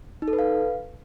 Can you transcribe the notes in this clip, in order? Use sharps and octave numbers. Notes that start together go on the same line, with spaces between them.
D#4
A4
B4
F5